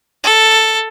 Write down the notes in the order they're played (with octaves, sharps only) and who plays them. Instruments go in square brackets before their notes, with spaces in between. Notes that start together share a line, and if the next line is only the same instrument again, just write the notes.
[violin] A4